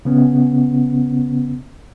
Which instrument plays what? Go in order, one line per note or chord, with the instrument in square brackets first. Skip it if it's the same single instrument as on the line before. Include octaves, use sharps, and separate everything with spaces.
[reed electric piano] C#3 B3 C#4